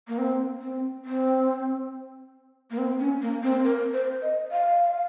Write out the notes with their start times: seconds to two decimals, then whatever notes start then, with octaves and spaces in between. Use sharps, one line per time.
0.08 A#3
0.18 C4
0.61 C4
1.05 C4
2.71 A#3
2.78 C4
2.99 C#4
3.22 A#3
3.43 C4
3.64 A#4
3.93 C5
4.22 D#5
4.51 F5